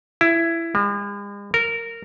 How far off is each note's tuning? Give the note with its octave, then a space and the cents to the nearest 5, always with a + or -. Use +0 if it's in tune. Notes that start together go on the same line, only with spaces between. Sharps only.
E4 +15
G#3 -45
A#4 -15